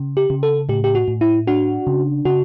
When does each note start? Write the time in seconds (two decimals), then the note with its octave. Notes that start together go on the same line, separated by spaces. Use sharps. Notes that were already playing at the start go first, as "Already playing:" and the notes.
Already playing: C#3
0.17 G4
0.30 C#3
0.43 A4
0.69 A2 G4
0.84 G4
0.95 F#4
1.08 A2
1.21 E4
1.47 D4 F#4
1.87 C#3
2.25 C#3 F#4